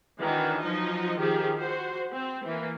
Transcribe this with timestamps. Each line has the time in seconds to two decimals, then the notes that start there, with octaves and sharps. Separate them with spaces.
0.20 D#3 E3 D4 F#4
0.62 F3 F#3 D#4 D#5
1.18 D#3 F3 G4 G#4
1.58 F#4 C5
2.13 C4
2.45 E3 A#3